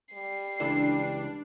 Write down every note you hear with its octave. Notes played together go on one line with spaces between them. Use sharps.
G3 C7
C#2 E3 D4 A4